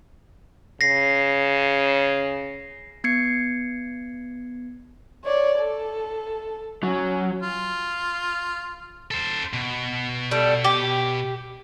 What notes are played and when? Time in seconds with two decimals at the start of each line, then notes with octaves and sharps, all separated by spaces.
0.81 C#3 A#6 C7
3.04 B3 G#6 C7 C#7
5.24 C#5 D5
5.59 A4
6.83 F#3 C#4
7.42 F4
9.11 A4 C5
9.53 B2
10.31 G3 A3
10.64 G4